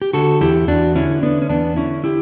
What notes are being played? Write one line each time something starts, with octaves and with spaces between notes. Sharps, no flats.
G4
D3 F#4 A4
E2 E4 G4
E2 D4 F#4
D3 C#4 E4
D3 B3 D4
C#4
E2 B3 D4
D3 C#4 E4
E4 G4